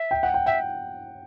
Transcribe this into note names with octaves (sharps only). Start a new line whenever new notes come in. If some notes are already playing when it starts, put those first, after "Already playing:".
Already playing: E5
G5
F#5
G5
E5 G5